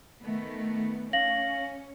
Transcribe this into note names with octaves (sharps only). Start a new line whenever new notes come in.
D#3 A3 B3
C#4 F5 A#6 F#7